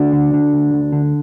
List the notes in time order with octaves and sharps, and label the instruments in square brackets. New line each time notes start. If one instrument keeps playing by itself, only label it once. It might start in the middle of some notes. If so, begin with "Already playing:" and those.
Already playing: [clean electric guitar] D2 D4 F#4
D3
D3
D2
D2
D3